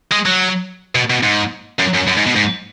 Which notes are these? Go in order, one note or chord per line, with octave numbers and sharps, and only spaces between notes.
G#3
F#3
B2
B2
G#2
F#2
F#2
F#2
G#2
B2
G#2